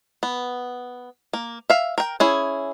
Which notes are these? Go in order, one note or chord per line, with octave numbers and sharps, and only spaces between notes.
B3
A#3
E5 F5
A#4 G5
C#4 E4 G#4